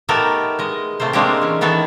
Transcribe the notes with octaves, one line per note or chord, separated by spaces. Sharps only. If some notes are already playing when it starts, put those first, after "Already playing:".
A3 B3 D#4 G4 A4 A#4
G#3 D#5
C3 A3 A#3 C5
G#3 A#3 C4 D4 F#4 G4
E3 C#4
D#3 E3 B3 A4 C#5